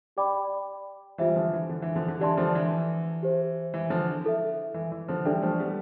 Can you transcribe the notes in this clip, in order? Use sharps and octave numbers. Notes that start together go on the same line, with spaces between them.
G4 D5 G5 B5 D6
E3 G3 F4 C5 E5
D3 F3
E3
D3
E3
D3 F3
D3
E3 G4 D5 A5 C6
D3 F3
E3
G4 C5 E5
E3
D3 F3
E4 A4 E5
E3
E3
D3 F3
E3 G3 D4 A4 D5 G5
F3 A3
G3 B3